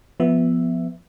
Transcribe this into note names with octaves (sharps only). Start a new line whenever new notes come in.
F3 B3 E5